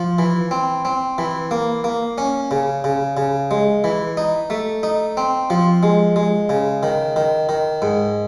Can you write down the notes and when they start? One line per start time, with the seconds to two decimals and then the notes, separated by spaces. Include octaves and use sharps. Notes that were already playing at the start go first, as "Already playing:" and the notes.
Already playing: F3
0.18 E3
0.51 C4
0.85 C4
1.18 E3
1.51 A#3
1.84 A#3
2.18 C#4
2.51 C#3
2.84 C#3
3.17 C#3
3.51 G#3
3.84 E3
4.17 D#4
4.50 A3
4.83 D#4
5.17 C4
5.50 F3
5.83 G#3
6.16 G#3
6.49 C#3
6.83 D#3
7.16 D#3
7.49 D#3
7.82 G#2